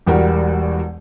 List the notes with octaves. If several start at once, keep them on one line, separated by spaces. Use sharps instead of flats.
E1 E2 G3 F#4 A#4